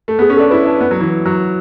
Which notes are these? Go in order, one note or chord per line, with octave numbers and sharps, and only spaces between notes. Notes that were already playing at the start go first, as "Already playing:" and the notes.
A3
B3 G#4
C#4
D4 A4
E4 B4
D4
B3
F#3
E3
F#3